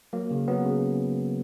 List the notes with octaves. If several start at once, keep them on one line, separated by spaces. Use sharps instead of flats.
F#3 A#3
C#3
F#3 B3
C#3